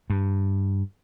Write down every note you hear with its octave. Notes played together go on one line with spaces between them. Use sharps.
G2